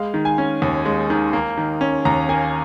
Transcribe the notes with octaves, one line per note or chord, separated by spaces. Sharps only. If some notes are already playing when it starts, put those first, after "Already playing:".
Already playing: G#3 F5
D#3
G#5
C#4
D#2
G#3
D#3
A#3
D#3
C#4
D#2 A#5
A#3 G#5